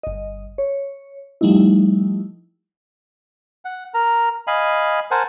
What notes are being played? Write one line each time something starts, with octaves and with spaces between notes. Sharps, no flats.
G1 D#5
C#5
F3 G3 A3 D#4 E4
F#5
A#4 A#5
D#5 F5 G#5 B5
A#4 C5 F#5 G#5 A5